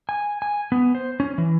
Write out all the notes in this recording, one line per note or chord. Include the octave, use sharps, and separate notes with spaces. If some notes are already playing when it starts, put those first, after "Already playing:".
G#5
G#5
B3
C5
C#4
E3